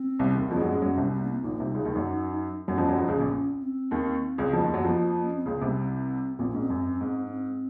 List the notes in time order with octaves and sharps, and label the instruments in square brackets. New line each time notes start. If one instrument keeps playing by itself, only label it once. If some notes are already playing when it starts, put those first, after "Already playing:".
Already playing: [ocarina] C4
[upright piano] C2 C3
D#2 D#3
[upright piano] F2 F3 [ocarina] C4
[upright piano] G#3
[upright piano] F#2 F#3 [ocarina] C#4
[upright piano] G#2 G#3 [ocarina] C#4
[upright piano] F#2 F#3
C2 C3
[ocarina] C4
A#3
C4
[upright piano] A#1 A#2 [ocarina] D#4
[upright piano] C2 C3
C#2 C#3
D#2 D#3
F#2 F#3
[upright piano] F#2 F#3 [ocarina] C#4
[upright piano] F2 F3
F#2 F#3
F2 F3
C#2 C#3
A#1 A#2
[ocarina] C4
[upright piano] D#2 D#3
C#2 C#3
F2 F3
D#2 D#3
F#2 F#3
[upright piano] F2 F3 [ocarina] A#3
[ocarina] C#4
C4
[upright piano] C#2 C#3 [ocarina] A#3
[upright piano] C2 C3
[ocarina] C4
[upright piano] A#1 A#2 [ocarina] C4
[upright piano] G#2 [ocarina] C#4
[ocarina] C4
[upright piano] F#2
G#2
[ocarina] C#4
C4